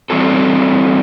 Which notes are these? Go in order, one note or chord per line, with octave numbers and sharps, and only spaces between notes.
E3 G3 C4 F#4 A4